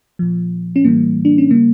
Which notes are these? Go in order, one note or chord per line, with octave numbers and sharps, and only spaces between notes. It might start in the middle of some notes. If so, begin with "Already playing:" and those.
A#2 F3
C#4
A2 E3 G3 A#3
D4
C#4
C#3 G3 A#3